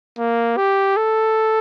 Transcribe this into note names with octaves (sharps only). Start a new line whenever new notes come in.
A#3
G4
A4